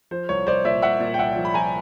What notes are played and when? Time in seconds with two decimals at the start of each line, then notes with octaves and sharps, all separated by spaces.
0.11 F3 C5
0.29 C2 C#5
0.47 C2 C5 D5
0.64 A#2 D5 E5
0.82 C2 E5 F#5
1.00 A#2
1.14 G5
1.19 C2 E5 F#5
1.36 F3
1.45 B5
1.54 F3 G#5 A#5